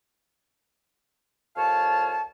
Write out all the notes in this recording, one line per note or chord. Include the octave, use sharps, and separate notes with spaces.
C2 F2 C#5 F5 A5